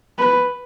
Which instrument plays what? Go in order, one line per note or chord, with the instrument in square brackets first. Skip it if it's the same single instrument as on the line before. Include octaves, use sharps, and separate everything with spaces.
[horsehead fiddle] B4